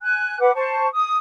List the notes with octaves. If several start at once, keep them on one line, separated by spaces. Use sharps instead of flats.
G#5 F#6
B4 F#5 D6
C5 A5 C#6
D#6